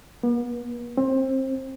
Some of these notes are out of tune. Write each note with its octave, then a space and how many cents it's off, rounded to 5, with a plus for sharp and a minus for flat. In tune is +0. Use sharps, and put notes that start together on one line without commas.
B3 -40
C4 +25